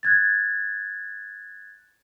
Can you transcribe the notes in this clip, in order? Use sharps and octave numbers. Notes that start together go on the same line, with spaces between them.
F#6 G#6 A6